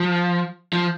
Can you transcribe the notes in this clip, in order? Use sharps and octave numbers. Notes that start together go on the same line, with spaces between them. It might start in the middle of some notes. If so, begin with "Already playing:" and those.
Already playing: F3
F3